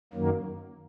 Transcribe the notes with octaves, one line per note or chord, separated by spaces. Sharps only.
F#2 D#3 F#3 A#3